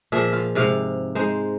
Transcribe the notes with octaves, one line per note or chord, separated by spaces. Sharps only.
A#2 F3 G#4 E5
F4
G#2 C3 F5
G#3 D#4 C5